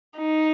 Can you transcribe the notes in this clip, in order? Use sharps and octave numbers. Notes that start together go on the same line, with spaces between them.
D#4